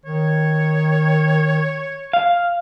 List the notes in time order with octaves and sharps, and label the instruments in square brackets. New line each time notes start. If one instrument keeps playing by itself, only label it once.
[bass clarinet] D#3 [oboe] C#5
[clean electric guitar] F5